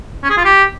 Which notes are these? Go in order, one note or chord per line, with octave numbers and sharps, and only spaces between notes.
C#4
G#4
F4
G4